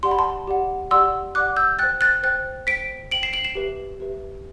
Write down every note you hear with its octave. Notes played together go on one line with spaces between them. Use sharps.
G4 D5 F#5 C6
B5
A5 C6
G4 D5 F#5
G4 D5 F#5 C6 E6
G4 D5 F#5 D6 F#6
E6 G6
C5 G5 F#6 A6
F#6 A6
C5 G5 F#6 A6
C5 G5 B6 D7
C5 G5 D7 F#7
C7 E7
D7 F#7
C7 E7
G4 B4 E5
G4 B4 E5